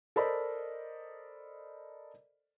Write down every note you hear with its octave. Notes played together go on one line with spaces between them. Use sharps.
A4 A#4 C5 D5 D#5 B5